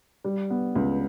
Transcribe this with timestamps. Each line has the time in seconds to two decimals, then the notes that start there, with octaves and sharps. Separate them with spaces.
0.24 G3
0.50 B3
0.75 C#2